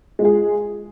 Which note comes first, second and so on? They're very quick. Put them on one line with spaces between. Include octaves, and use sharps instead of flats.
G#3 F4 G#4